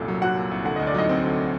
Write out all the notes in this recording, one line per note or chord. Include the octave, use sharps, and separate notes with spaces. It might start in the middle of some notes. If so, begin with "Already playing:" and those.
Already playing: C2 F#2 A#2 A4
F#3
C2 F#4 F#5
A#2
C2
D3 F#5
D2 D#5
D5
F#3 D#4 D#5
C4
D3